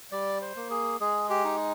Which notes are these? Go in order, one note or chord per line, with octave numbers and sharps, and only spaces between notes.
G3 D5
C5
A#3
G#4
G#3 G#4
G4
D#4